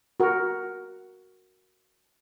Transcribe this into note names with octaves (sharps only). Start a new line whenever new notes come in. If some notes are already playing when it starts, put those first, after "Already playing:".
F#4 A#4